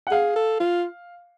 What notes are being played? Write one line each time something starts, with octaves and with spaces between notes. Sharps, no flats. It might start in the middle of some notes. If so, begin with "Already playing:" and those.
F#5
G#4 F5
A4
F4